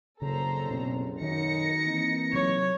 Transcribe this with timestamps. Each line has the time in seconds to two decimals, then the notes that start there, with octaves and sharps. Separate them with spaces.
0.22 F#1 C2 F#2 C#3 A4 C5 A#5
0.71 B2 C4
1.21 B1 F#2 D#3 D#4 A#6 C#7
1.84 E3 A#3 C4
2.33 C3 F#3 C#5